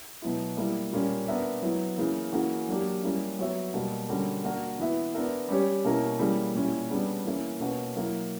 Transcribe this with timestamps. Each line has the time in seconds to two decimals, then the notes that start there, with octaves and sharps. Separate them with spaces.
0.22 B2 F#3 B3 E4
0.57 G3 A#3 E4
0.92 A#2 G3 A#3 C#4
1.28 B3 D4 A#4 E5
1.62 F#3 B3 E4
1.98 C#3 E3 A#3
2.33 C#3 E3 A#3 C#4 F#4
2.69 F#3 A#3 D4 G4
3.03 G3 A#3 C#4 E4
3.39 F#3 B3 F#4 C#5 E5
3.74 B2 G3 A#3
4.09 D3 G3 C#4 F#4 A#4
4.44 A#3 D4 F#4 A#4
4.79 E3 B3 E4 B4 E5
5.14 B3 D4 A#4 E5
5.49 G3 C#4 G4 C#5
5.84 B2 A#3 C#4 E4 A#4
6.19 C#3 E3 G3 A#3
6.55 A#2 G3 C#4 E4
6.90 C#3 G3 B3 D4
7.25 E3 A#3 C#4 E4
7.60 B2 A#3 C#4 F#4 B4
7.96 F#3 A#3 E4